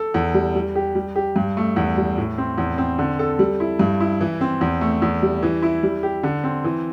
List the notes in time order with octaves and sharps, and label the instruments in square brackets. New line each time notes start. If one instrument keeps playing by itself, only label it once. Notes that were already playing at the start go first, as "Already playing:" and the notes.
Already playing: [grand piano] A4
E2
G3
G3
G4
G3
G4
G2
A3
E2
G3
A2
C4
E2
C4
D3
A4
G3
E4
G2
E4
E3
C4
E2
A3
E2
G3
E3
E4
G3
G4
D3
C4
E3